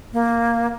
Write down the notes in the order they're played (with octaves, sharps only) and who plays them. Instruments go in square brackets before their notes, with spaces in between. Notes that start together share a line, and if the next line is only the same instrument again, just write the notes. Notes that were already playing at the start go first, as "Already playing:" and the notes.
[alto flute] A#3